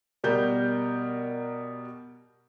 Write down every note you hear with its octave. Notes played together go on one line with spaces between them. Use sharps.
B2 G3 A#4 G6